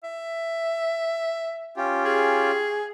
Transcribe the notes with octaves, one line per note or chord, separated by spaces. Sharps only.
E5
C#4 F4 G4
G#4